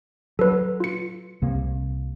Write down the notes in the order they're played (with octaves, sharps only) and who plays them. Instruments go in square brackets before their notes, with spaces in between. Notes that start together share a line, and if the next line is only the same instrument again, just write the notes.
[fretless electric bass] F#3 [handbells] A4 B4
[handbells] F4 C#7
[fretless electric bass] C2 C3 A#3